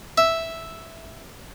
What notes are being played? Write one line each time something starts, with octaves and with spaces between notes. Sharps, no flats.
E5